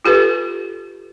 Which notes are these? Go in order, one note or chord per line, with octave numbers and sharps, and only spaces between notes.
F4 G4 A4 B4